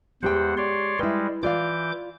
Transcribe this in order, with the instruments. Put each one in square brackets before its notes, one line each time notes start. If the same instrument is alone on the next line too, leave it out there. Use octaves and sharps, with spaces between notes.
[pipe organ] E2 C5 F#5 [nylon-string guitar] G#3 G4 G5
[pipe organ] C#5 D5 C6
[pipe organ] G3 G#3 [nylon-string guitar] E4 B4
[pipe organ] E3 D6 G6 [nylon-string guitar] F4 D5 F5